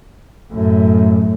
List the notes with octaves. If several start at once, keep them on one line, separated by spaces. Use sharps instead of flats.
F#2 A2